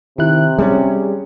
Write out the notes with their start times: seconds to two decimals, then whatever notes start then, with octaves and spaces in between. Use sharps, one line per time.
0.18 C3 D#3 E4 F#6
0.59 G3 B3 C#4 G#4